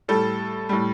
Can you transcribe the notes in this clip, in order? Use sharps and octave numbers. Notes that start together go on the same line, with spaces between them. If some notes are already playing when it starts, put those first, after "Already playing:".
A2 G3 A4
A2 G3